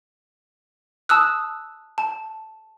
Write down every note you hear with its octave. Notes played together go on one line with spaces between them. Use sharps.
A5 D#6 E6 F#6
A5